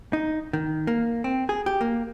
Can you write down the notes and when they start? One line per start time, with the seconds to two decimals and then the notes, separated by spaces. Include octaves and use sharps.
0.13 D#4
0.53 D#3
0.87 A#3
1.24 C4
1.49 G#4
1.66 G4
1.81 A#3